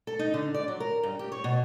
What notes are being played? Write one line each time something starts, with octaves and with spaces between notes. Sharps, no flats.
A4
D#4
D3
D5
F#3
A#4
G2
G4
C#5
B2